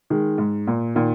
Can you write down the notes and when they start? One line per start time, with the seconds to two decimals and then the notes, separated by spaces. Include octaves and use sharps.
0.10 D#3 G#3
0.38 G#2
0.67 A#2
0.95 A#2 D#3